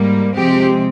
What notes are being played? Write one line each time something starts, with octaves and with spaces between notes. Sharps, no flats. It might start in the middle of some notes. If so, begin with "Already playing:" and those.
Already playing: G#2 G3 A#3
C3 F3 G#3 C4 G4